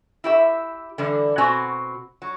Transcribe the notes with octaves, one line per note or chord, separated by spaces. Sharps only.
E4 G4 E5
D3 E3 G3
B2 C4 F#4 G#5 A#5
F#3